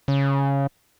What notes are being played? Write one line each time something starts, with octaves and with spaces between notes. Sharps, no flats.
C#3